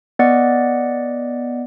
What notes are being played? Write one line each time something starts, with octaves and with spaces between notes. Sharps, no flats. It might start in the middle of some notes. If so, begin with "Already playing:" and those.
B3 D5 D#5 F#5